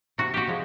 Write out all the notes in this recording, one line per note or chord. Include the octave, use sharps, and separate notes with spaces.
C3 F#4
F#4 G4
F3 G#3